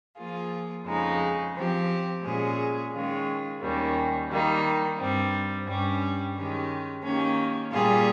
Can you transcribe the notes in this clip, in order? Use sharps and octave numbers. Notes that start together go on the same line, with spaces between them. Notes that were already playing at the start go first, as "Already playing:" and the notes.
F3 A#3 F4 G#4
F2 C#3 G#3 D#4
F3 C4 G4
A#2 G#3 C#4 G#4
D#3 G#3 C#4 F4
D#2 D#3 G3 A#3 C#4
D#3 G3 A#3 D#4
G2 G3 C4
G2 G3 C#4
D#3 G#3 C#4 G4
D#3 A#3 C#4 G4
A#2 G3 A#3 F4 G#4